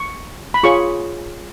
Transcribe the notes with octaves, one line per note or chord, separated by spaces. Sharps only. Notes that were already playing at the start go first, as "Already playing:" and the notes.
Already playing: C#6
B5
F4 G#4 C#5 C#6